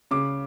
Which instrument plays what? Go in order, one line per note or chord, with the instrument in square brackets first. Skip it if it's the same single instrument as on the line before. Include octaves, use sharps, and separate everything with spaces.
[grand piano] C#3 D6